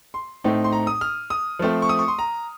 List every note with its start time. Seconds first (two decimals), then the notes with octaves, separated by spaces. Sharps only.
0.14 C6
0.44 A2 A3 C4 D#4
0.64 C6
0.72 A#5
0.87 D#6
1.01 F6
1.30 D#6
1.59 F3 A3 C4
1.82 C#6
1.89 D#6
1.99 C#6
2.08 C6
2.19 A#5